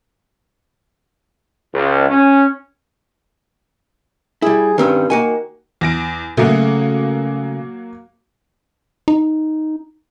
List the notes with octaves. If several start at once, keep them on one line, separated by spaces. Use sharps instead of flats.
C#2
C#4
G3 E4 G#4
G2 D#3 C4 C#4
D#3 A#3 F#4 G#5
E2 A#6 D7
C#3 F#3 A3 A#3 F#4
D#4